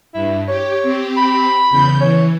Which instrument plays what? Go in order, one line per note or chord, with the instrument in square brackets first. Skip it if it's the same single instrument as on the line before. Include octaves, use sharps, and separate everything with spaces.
[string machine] G2 [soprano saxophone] E4
[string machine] G4 [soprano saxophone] C#5
[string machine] C4 G4
[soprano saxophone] B5
[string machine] E2 C#3 G6
[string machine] E3 [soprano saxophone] C#5